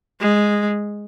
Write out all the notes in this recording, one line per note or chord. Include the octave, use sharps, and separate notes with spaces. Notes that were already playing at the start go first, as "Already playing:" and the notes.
G#3